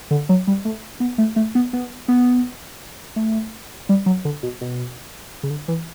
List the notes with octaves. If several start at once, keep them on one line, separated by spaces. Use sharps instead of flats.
D3
F#3
G3
A3
B3
A3
A3
B3
B3
B3
A3
G3
F#3
D3
B2
B2
C#3
D3
E3